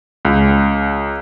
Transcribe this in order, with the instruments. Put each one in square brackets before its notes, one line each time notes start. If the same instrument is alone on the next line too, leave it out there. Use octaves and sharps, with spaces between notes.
[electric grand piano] C#2